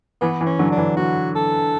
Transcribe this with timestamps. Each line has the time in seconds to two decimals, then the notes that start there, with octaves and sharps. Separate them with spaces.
0.21 E3 B3
0.41 E3
0.46 C#4
0.59 D3 F#3
0.72 D4
0.78 E3
0.97 D3 F#4
1.36 A4